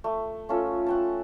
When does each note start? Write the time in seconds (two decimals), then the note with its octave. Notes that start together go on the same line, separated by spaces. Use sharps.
0.04 A3
0.49 A3 C#4 F4 A4
0.86 F#5 G5 A5